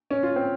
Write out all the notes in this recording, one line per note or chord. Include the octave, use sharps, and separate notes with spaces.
C#4
F4
C4